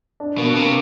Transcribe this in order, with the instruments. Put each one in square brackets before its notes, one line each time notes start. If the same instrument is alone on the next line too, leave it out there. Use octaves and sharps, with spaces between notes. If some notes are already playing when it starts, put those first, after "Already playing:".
[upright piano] D4
[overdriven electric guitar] B2 [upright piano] A#3
[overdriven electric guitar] C3 [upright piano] A#3